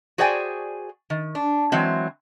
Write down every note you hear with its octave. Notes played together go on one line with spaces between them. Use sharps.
F#4 G#4 C5 D5 G5 G#5
D#3
D4
E3 F#3 G#3 C4